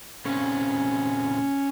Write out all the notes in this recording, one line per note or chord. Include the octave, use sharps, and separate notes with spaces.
A#2 C#3 C4 C#4